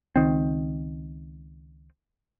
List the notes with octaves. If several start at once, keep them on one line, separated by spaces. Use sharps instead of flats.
C#2 D#3 C4